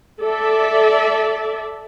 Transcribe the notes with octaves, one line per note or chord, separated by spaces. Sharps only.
A4 D5 E5